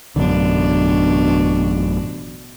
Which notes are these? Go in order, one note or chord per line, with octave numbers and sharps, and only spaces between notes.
A1 F#2 B2 D3 D4